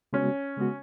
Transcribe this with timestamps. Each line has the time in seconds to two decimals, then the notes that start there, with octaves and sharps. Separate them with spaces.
0.13 C#3 G#3 B3 C#4 F#4
0.57 C#3 G#3 B3 F#4